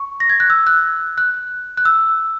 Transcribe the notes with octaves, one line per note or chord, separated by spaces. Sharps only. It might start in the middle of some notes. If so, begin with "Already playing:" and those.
Already playing: C#6
A#6
G#6
F#6
E6
F#6
F#6
F#6
E6